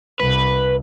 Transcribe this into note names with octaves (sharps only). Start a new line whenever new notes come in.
C2 B4